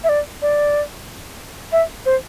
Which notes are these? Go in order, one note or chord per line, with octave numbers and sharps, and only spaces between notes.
E5
D5
D5
E5
C5